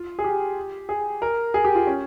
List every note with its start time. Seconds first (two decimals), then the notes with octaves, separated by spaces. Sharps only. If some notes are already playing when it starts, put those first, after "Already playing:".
Already playing: F4
0.19 G#4
0.24 G4
0.89 G#4
1.22 A#4
1.54 G#4
1.65 G4
1.75 F4
1.87 C#4